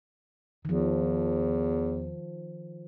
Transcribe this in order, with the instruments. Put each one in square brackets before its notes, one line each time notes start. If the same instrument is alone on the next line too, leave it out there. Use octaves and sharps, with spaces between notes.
[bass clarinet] E2 [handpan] D#3 F3